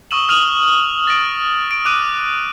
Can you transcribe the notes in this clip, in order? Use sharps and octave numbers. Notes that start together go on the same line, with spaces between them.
C#6 D#6 E6 D#7 E7 F#7
D#6 F6 D#7 F7 F#7
A6 A#6 D7
D7
D6 F#6 D#7